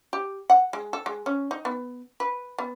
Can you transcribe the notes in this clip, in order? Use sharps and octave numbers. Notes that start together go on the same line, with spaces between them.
G4
F#5
G#3
A4
G#3
C#4
D#4
B3
B4
B3